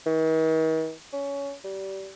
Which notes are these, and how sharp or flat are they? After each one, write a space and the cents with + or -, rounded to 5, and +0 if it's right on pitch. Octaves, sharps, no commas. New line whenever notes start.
D#3 +45
C#4 +15
G3 -25